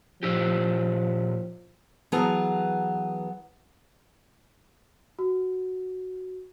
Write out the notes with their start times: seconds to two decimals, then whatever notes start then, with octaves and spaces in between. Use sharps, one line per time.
0.23 A#2 F3 E4 G4
2.12 E3 F#3 B3 G#4 A5 A#5
5.19 F#4